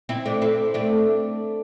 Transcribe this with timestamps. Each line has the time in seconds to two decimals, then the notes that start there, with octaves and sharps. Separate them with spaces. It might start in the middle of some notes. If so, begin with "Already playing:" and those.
0.09 C4 E4
0.26 A3 D4
0.42 C4 E4
0.74 A3 D4